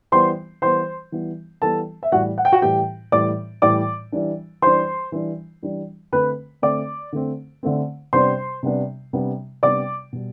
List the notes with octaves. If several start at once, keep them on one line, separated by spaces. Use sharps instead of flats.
E3 G3 B3 C5 C6
E3 G3 B3 C5 C6
E3 G3 B3
E3 G3 B3 A4 A5
E5
A2 E3 G3 F#4 F#5
F#5
G5
F#4 F#5
A2 E3 G3 G4 G5
A2 E3 G3 D5 D6
A2 E3 G3 D5 D6
E3 G3 D4
E3 G3 D4 C5 C6
E3 G3 D4
E3 G3 D4
D3 A3 C4 B4 B5
D3 A3 C4 D5 D6
D3 A3 C4
D3 A3 C4
C3 G3 B3 D4 C5 C6
C3 G3 B3 D4
C3 G3 B3 D4
C3 G3 B3 D4 D5 D6
B2 G3